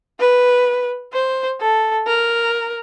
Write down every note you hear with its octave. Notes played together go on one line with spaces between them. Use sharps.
B4
C5
A4
A#4